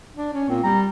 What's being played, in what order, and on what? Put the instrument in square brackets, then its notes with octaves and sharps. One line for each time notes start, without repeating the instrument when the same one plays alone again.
[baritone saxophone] D4
C#4
[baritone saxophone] A#2 [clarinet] C4
[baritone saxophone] G3 [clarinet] A#5